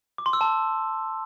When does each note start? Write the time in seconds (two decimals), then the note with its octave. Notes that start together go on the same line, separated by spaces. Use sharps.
0.18 D6
0.26 C6
0.33 E6
0.41 A5